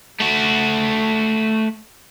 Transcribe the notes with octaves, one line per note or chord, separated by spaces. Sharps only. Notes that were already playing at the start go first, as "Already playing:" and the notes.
A3 F#4